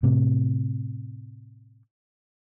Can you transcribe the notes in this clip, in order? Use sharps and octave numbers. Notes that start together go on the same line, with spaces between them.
A2 C3